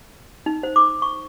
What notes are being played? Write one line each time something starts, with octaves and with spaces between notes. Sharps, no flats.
D#4
C5
D6
C#6